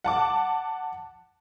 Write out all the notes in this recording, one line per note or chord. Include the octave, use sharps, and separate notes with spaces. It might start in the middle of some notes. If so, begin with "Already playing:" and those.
F#5 A5 D6